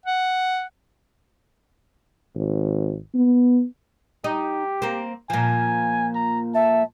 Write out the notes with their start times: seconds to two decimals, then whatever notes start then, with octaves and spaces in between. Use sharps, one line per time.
0.06 F#5
2.35 G#1
3.14 B3
4.24 D#4 G4
4.82 A#3 C4
5.30 A#2 F3 G#5
6.15 A#5
6.55 E5 A5